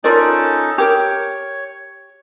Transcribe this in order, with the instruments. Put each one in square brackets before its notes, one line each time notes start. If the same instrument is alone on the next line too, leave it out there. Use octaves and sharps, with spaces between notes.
[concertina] C#4 D#4 A4 [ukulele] F4 A#4 D5
[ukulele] G4 A#4 [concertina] C#5